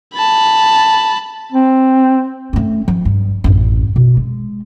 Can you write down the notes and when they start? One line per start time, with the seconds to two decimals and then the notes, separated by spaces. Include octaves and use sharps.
0.15 A5 B5
1.52 C4
2.53 A3 C#4
2.88 F3
3.05 G2
3.44 A1 F#2
3.96 B2
4.17 G#3